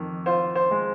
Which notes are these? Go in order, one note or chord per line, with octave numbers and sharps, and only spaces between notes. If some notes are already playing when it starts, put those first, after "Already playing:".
Already playing: F2 D#3
F4 C5
C5
G#3